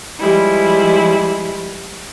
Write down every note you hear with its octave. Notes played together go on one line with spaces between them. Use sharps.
F3 G3 G#3 E4